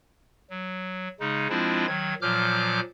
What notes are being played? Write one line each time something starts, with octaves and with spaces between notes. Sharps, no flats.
F#3
C#3 G#3 D#4
F3 G#3 C4 D4 E4 F4
D#3 F#3 G#6
A#2 F3 F#3 D6 F6 G6